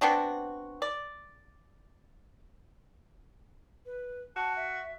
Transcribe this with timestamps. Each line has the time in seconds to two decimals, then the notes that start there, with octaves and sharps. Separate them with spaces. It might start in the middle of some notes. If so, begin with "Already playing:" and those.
0.01 B3 C4 D4 F#4
0.82 D5
3.86 B4
4.36 F#4 A5
4.56 E5